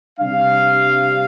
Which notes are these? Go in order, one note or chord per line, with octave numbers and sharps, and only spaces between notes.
C3 G3 D4 F5